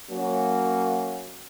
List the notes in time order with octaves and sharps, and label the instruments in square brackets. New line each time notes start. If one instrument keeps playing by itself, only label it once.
[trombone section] F#3 A#3 C#4 F#4